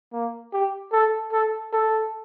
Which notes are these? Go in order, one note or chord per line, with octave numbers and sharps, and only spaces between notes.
A#3
G4
A4
A4
A4